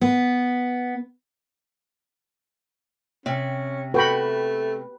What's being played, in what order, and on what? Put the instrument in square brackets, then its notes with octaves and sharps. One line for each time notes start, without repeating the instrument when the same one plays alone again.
[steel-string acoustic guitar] B3
[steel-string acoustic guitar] C3 [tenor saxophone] C#4
[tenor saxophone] A3 [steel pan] F#4 G5 B5 [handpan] B4